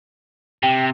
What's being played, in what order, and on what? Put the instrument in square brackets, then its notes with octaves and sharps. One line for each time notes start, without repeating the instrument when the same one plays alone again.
[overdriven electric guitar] C3 [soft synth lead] G5